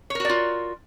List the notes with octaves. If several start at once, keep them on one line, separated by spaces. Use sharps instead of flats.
F4 F#4 A#4 C#5 D5